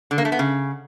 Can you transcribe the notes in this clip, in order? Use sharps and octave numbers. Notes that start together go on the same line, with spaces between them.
D3
A#3
A3
B3
C#3